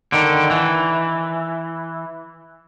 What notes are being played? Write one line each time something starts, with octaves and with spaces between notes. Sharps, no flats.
D3 D#3
E3